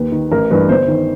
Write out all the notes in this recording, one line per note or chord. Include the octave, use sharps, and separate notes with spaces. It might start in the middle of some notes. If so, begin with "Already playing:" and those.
Already playing: D#2 B4
D#3
A1 A#4
G2 E3 B4
G1 C5
D#3